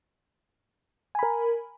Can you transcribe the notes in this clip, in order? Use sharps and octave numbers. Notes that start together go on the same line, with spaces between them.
A#4 G#5 B5